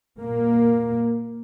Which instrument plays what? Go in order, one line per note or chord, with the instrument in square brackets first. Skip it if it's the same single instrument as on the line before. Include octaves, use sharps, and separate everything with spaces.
[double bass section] A#2 A#3